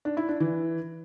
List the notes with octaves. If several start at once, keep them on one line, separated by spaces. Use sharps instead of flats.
D4
E4
D4
E3